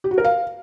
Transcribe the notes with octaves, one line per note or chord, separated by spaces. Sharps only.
G4
F#4
A#4
F5